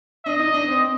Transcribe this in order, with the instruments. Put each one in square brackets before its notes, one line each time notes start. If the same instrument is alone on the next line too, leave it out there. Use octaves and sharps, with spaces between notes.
[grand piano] D4 [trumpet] D#5
[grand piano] D#4
D4
C4